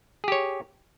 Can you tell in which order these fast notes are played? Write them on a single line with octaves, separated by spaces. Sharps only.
G#4 G4 C#5